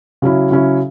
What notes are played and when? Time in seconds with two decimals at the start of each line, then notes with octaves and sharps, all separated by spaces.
0.22 C#3 F#3 C#4 E4
0.51 C#3 F#3 C#4 E4